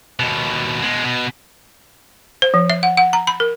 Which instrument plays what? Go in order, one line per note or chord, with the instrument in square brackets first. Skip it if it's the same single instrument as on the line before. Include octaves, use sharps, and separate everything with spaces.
[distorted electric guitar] D#2 B2
B2 G#3
B2
[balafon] C5
F3
E5
F#5
F#5
A#5
B5
A#4